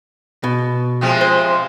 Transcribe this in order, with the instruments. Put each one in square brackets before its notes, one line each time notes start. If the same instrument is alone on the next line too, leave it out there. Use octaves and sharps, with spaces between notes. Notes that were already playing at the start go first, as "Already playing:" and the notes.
[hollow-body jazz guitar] B2
[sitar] C3 F3 G#3
[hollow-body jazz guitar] C5